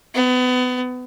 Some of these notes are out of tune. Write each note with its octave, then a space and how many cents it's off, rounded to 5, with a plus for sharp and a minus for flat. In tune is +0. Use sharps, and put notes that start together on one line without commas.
B3 +30